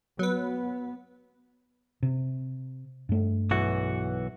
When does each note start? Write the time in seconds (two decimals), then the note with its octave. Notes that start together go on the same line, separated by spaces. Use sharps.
0.19 F#3 B3 B4
2.03 C3
3.09 G2 A3
3.51 B1 E3 F#4